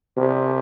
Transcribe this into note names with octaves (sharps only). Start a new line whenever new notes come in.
C3